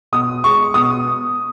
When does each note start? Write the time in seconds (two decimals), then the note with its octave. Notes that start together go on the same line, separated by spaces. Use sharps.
0.12 B2 D#6
0.43 G#3 C#6
0.74 B2 D#6